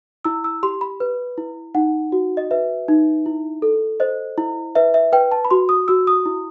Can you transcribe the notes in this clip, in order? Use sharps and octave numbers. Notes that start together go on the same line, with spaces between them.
E4 E6
E6
G4 C6
B5
B4
E4
D#4 F#5
F#4
D#5
B4 E5
D#4
E4
A4
C5 D#5
E4
B4 E5
E5
B4 G5
A5
B5
F#4 C6
D#6
F#4 E6
D#6
E4